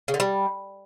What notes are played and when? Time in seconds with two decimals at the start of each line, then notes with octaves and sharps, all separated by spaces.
0.08 C#3
0.14 D3
0.20 G3